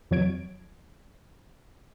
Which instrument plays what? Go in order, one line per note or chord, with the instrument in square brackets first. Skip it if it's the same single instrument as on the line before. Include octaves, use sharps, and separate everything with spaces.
[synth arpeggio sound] F2 F#3 C#5 G#6 D7